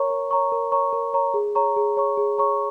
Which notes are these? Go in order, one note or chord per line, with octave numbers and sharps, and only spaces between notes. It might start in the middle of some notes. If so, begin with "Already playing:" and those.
Already playing: A#4 C#5 A#5 C#6
A#4
C#5 A#5 C#6
A#4
C#5 A#5 C#6
A#4
C#5 A#5 C#6
G#4
C#5 A#5 C#6
G#4
C#5 A#5 C#6
G#4
C#5 A#5 C#6